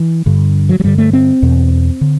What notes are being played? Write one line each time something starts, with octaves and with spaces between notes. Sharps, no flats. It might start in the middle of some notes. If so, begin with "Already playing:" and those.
Already playing: E3
G2 D3
F#3
F#3
G2 D3 G3
A3
C4
E2 B2
D3